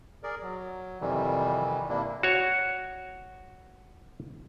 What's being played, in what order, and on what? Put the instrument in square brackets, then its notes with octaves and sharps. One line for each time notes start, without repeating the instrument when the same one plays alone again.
[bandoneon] G#4 A#4 D5
F#3
F2 C3 D#3 E3 G3
G2 C3 G3 A#3 D4 E4
[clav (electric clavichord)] F#4 C#5